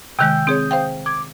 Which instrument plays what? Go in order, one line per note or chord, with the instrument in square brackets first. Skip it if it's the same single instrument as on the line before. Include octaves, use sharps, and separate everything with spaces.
[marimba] C3 D#3 G#3 [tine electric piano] G5 E6 G6
[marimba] C4 G#4 C#5 [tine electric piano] D#6 G6
[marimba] C5 F5 G5
[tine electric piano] D6 [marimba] G#6